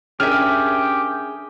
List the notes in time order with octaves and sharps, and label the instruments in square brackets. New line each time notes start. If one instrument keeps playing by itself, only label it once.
[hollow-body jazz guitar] C#4 D4 A#4 [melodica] G4 G5 [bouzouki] G#4 E5 [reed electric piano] F6